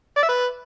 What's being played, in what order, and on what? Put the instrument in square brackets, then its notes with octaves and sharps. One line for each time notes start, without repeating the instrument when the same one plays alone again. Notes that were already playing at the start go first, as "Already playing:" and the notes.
[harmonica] D5
E5
B4